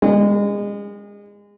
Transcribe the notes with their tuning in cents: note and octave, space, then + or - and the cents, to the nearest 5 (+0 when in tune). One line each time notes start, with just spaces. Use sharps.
G#3 -30